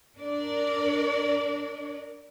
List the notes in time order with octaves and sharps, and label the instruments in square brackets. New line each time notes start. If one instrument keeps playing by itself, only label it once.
[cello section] D4 A#4 D5